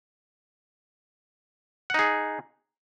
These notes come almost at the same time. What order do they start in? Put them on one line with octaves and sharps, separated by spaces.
F#5 D#4 G#4